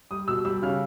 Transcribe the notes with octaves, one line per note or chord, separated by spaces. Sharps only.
G3 D#6
B2 E6
G3 E6
C#3 F6